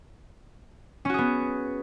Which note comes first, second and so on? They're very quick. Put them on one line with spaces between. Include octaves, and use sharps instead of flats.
C#4 F#4 G#4 B3